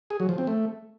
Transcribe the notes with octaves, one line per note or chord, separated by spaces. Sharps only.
G#4
F#3
F3
C4
A3